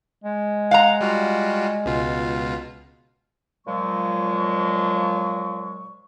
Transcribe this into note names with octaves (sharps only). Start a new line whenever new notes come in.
G#3
F5 F#5 A#5
G3 F4 F#4
C#2 B2 F4
A#2 F3 F#3 G#3 C#6